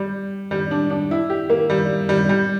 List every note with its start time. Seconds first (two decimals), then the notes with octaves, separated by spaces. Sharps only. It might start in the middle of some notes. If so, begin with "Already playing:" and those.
Already playing: G3
0.51 G3
0.71 D4
0.90 D4
1.11 E4
1.30 G4
1.50 A#3
1.70 G3
2.09 G3
2.29 G3